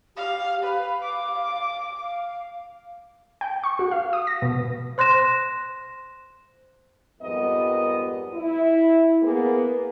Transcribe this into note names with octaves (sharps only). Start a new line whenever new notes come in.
G4 F5
B4 F5
D6
F5
G5
C#6
F#4
F5
D#6
A#6
B2
C5 C6 F#6 A#6 E7
F2 G#2 G3 B3 A#4 D#5
E4
A#3 B3 G#4